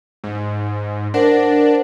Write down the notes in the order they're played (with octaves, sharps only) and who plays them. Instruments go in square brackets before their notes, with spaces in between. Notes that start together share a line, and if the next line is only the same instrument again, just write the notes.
[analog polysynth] G#2
[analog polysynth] D4 [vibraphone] A#4 C5 F#5